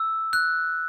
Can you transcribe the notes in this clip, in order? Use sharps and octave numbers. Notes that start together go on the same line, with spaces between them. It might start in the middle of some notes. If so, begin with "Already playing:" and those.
Already playing: E6
F#6